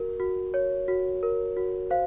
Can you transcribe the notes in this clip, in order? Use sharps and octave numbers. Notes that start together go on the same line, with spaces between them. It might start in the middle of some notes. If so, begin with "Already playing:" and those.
Already playing: F#4 A#4
F#4
C#5
F#4
A#4
F#4
C5 F5